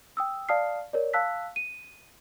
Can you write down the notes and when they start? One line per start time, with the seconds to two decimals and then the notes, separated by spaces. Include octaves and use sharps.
0.17 G5 D#6 E6
0.49 D5 F5 A5 D#6 F6 C7
0.93 A#4 C#5 D5
1.13 F5 A5 E6 F#6 B6
1.56 D#7